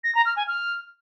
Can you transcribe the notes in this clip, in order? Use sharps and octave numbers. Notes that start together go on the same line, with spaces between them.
A#6
A#5
F6
G#5
F6